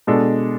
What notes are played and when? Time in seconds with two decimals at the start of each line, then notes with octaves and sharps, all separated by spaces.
0.07 B2 G#3 D4 A4